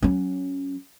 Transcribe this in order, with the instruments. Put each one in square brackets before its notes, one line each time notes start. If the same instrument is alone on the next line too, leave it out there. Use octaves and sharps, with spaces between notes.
[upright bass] F#3 C#4